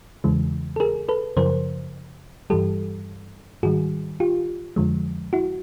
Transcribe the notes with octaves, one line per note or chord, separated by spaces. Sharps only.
E2 C#3 E3 G#3
A4
G#4 A#4
A4 B4
F#2 C#3 F3 A#4 C5
G2 E3 G3 G4 A4
G#2 D#3 G3 F#4 G#4
F4 G4
F2 D3 F3 G#3
E4 F#4